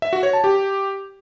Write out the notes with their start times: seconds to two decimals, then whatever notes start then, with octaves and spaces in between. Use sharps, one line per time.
0.02 E5
0.13 F#4
0.23 C#5
0.33 A5
0.44 G4